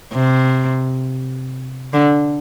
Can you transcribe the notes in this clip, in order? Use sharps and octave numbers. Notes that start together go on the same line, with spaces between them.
C3
D3